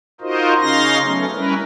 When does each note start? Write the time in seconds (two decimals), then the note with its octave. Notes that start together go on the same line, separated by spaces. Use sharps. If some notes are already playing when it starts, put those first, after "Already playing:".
0.21 D#4 F4 F#4 A#4 C5 D#5
0.60 C#3 C#4 D#4 F5 C6 A#6
1.03 F#3 A3 B3 C#4
1.33 G3 C#4 E4 A#4 B4